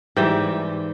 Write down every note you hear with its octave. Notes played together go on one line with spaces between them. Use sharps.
G#2 E3 G3 G5